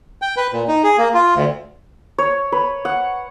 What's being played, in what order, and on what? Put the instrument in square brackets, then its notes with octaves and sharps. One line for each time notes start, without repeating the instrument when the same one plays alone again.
[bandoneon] G5
B4
A#2
D#4
G#4
A#3
F4
D2
[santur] C#5
B4
F#5